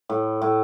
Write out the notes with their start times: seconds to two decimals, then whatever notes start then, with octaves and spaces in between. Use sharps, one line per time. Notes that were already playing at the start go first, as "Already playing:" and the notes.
0.09 A2
0.42 A2